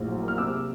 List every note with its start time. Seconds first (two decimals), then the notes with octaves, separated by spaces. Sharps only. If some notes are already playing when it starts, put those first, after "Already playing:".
Already playing: A#1 A2
0.08 F#3
0.23 A#3 F6
0.38 C3 D6 E6